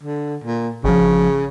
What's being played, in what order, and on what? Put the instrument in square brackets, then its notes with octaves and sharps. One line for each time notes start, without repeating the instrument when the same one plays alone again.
[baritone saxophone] D3
A#2
[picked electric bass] G#1 F3 [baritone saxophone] C#3